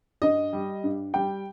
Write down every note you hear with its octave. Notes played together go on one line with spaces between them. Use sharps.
G2 D#5
G3
G2
G3 G5